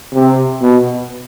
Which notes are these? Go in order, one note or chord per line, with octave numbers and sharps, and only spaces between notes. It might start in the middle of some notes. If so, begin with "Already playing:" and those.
C3
B2